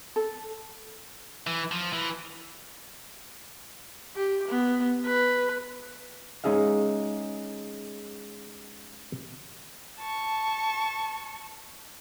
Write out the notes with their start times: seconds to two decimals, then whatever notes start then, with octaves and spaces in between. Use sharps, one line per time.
0.16 A4
1.47 E3
1.71 F3
1.93 E3
4.16 G4
4.48 B3
5.06 B4
6.44 G#3 C#4 D#4 G#4 E5 F5
9.99 A5 C#6